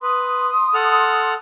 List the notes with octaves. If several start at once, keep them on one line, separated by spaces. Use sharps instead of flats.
B4 C6 D#6
A4 F#5 F6